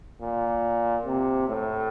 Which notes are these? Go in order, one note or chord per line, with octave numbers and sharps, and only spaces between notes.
A#2
C3
A2